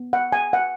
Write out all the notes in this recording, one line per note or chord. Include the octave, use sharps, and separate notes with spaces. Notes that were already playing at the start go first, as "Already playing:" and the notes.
Already playing: B3
F#5
G#5
F#5